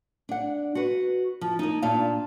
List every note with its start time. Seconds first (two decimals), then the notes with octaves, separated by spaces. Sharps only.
0.29 D4 F#5
0.75 F#4 B4
1.41 F3
1.59 A#3 D#4
1.82 A#2 D4 F4 F5 A5